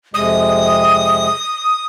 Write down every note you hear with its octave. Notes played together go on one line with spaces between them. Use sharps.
F2 C3 G#3 D#6